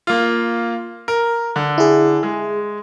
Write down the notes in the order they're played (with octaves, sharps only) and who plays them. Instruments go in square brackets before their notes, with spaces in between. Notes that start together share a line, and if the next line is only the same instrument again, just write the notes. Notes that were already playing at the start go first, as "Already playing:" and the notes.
[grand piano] A#3 F4
A#4
D3
[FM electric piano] E4 G#4
[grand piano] G#3